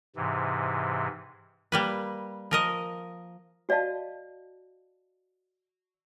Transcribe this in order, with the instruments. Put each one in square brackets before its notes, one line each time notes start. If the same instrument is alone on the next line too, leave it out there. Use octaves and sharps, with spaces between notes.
[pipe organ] G#2 C3 E3
[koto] G3 A#3 B4
F3 A#4 D#5
[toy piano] F#4 D5 D#5 F5 A5